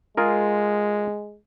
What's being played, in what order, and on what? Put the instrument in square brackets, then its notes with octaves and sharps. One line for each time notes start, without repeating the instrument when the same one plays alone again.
[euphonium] G#3 [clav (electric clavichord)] F4 G#4 A#4